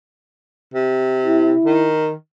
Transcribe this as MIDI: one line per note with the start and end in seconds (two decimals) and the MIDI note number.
0.74 1.53 48
1.25 1.88 64
1.65 2.12 51